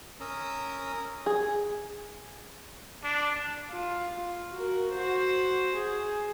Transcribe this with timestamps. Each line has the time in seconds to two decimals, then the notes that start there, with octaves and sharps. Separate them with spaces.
0.21 C#4 A#4 A#5 D#6 E6
1.26 G#4
3.04 D4
3.72 F4
4.52 F#4 A#4
4.94 F#4 C5
5.77 G#4